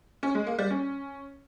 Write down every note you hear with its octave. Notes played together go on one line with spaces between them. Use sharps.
C#4
G#3
A#3
G3
C#4